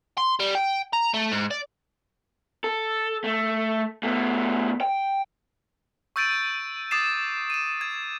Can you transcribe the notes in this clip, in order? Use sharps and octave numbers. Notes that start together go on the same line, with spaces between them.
C6
G3
G5
A#5
A3
G#2
D5
A4
A3
B2 A3
G5
C#6 E6 G6 A6 D7 D#7
D6 D#6 A6 C7 E7
D#7 E7
G#6